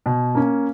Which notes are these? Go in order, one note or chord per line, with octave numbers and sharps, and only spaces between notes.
B2
A#3 C#4